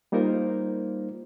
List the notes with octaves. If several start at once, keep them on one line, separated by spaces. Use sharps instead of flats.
G3 A#3 D#4 F4 A#4 C5